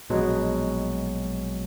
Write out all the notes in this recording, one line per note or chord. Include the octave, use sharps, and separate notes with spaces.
A#1 B2 F#3 G#3